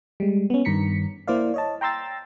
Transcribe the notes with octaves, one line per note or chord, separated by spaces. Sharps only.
G3 G#3
B3 C#4
G2 D#3 A#5 B6 C#7
A#3 E4 C5 D5 F5
C#5 D#5 A5
G5 A#5 C6 E6 A6